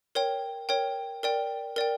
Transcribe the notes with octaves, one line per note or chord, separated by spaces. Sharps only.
A#4 C#5 G5
A#4 C#5 G5
A#4 D5 G5
A#4 D5 G5